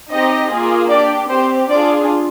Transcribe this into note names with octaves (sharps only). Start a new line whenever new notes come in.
C4 D#4 G4 D#5
A#3 F4 G#4
D4 G4 D5
C4 G4 C5
D4 F4 G#4 D5